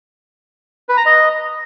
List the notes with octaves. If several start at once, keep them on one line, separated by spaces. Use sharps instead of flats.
B4
A#5
D#5